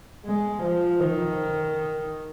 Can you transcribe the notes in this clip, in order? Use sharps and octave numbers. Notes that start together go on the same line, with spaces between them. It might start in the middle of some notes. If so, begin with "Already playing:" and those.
G#3
F3
D#3